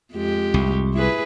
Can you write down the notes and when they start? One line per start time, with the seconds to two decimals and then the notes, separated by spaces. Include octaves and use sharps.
0.13 F2 G#3 G4
0.54 C2
0.94 E4 G#4 B4